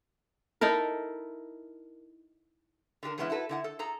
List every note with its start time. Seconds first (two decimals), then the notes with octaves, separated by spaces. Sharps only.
0.61 D#4 E4 A4 A#4
3.03 D3 D4 G4 A#4
3.18 E3 G#3 B3 C#4 D#4 E4
3.30 E4 F#4 A4 B4
3.49 D3 E4 F#5
3.64 A4
3.79 G#4 A4 A#5